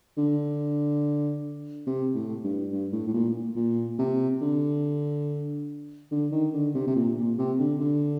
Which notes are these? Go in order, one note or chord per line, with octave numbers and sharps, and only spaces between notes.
D3
C3
A2
G2
G2
A2
A2
A#2
A#2
C3
D3
D3
D#3
D3
C3
C3
A#2
A#2
C3
D3
D3